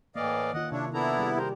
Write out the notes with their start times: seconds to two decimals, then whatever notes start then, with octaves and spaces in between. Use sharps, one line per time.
0.16 A2 E3 A#3 D5 D#5 F5
0.54 D#3 A#3 F4 D#5 F#5
0.72 C3 D4 E4 C#5
0.93 B3 D4 E4 A4 A#5
1.18 G3 G#4
1.38 G4 A#4 C5